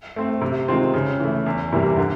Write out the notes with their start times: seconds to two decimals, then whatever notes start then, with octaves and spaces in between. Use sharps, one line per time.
0.16 A3 C4
0.42 C3
0.68 D#3 G#3 C4 F4
0.94 C#3
1.20 E3 A3
1.46 E2
1.72 C3 E3 G3 A#3
1.97 D3